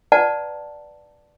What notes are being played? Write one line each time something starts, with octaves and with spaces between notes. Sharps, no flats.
B4 D5 F#5 A5 A#5